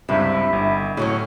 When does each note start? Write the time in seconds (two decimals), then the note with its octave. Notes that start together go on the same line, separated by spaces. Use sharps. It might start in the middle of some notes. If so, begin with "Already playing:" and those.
0.09 C#2 G2 C3 E4 E5
0.53 G1
0.97 A2 F#3 C4 C#4